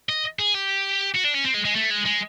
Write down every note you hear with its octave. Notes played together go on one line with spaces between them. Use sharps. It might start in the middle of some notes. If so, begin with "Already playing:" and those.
D#5
G#4
G4
F#4
D4
C#4
C4
G#3
G#3
A3
G#3
G#3